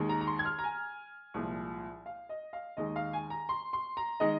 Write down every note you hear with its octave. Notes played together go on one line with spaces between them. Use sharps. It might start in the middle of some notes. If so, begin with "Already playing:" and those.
Already playing: D#2 D#3 G#3
A#5
A#5
C6
G#6
F6
A#5
G#5
C2 A#2 F3 G#3
F5
D#5
F5
D#2 D#3 G#3 D#5
F5
G#5
A#5
C6
C6
A#5
D#3 G#3 D#5